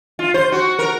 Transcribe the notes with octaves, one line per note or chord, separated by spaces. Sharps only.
F4
C5
F#4
A#4